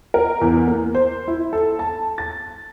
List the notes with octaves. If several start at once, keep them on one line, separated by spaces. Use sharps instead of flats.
A#4
E2
A#3
C5
E4
A4
A5
A6